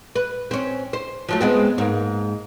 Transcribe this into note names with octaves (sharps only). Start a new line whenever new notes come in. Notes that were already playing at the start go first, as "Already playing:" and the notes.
B4
C4 C#4
C5
F3 F#3 A3
G#3 B3 C4
G#2 A#3